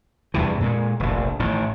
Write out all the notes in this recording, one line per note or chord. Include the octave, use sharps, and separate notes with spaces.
E2 G2 C3 E3
A#2 G#3
F1 A#1
A1 A2 D#3